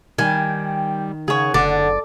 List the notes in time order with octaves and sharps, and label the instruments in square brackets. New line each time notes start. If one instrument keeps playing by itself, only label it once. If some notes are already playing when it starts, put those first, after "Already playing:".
[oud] D#3 [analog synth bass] G3 [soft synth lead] G5 [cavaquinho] G#5
[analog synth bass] C#3 [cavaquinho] G#4 C#5 [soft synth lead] F#5
[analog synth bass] F#1 [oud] D3 [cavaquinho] D5